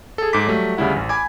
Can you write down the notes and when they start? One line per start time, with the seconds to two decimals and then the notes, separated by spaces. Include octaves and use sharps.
0.18 G#4 A4
0.33 G#2 A4 D6 B6
0.47 F#3 G3 A3
0.77 D2 C#3 G3 E4 F#5
0.96 A1
1.09 G#5 B5 D6 G#6